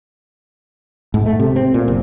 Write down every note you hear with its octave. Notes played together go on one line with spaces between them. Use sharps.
G#2
A3
C3
C4
A#2
F#1